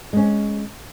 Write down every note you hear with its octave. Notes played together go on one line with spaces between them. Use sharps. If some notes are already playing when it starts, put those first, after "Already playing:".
G#3 C#4